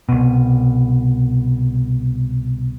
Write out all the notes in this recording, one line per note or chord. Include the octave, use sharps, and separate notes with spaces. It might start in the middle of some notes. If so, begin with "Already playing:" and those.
C2 B2